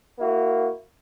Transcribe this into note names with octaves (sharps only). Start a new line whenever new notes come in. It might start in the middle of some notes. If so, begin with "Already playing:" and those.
A#3 E4 F#4